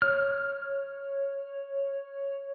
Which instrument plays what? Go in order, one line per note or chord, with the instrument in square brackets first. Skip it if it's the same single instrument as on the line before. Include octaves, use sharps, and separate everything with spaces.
[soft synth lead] C#5 [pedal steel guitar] F6